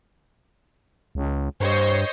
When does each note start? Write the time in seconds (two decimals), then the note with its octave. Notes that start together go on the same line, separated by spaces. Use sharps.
1.15 C#2
1.60 G2 C5 C#5 D#5